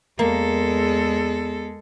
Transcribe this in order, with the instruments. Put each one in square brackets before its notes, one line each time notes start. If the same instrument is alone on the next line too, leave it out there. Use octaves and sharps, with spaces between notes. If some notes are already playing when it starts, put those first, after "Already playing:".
[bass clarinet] E2 [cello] G#3 A4 [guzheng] A#3